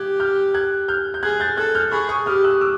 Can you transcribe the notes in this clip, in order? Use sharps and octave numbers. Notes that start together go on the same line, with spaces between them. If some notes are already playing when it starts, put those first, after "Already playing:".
Already playing: G4 F#6 G#6
F6 G6
F#6 G#6
F6 G6
G6
G#4 F#6 G#6
G6 A6
A4 F#6 G#6
F6 G6
G#4 B5 C#6
C#6 D#6
G4 D#6 F6
E6 F#6
D6 E6